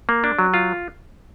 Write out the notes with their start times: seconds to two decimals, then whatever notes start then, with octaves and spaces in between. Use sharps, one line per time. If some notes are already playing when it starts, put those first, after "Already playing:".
0.09 A#3
0.24 D4
0.39 F#3
0.54 F4